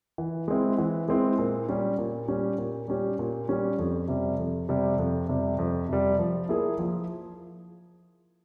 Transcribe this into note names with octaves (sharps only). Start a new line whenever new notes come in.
E3
G#3 C4 E4
E3
G#3 C4 E4
A#2
G3 C#4 G4
A#2
G3 C#4 G4
A#2
G3 C#4 G4
A#2
G3 C#4 G4
F2
C3 G3
F2
C3 G3
F2
C3 G3
F2
C3 G3
F3
A#3 E4 G#4
F3